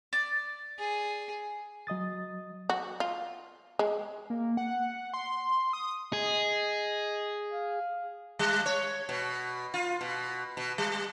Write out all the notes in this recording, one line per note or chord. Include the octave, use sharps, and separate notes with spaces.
D5
G#4
F#3 D#5 D#6 A6
F#4
F4
G#3
A#3
F#5
C6
D#6
G#4 D#5
F5
G3
C#5
B2
F4
B2
B2
G3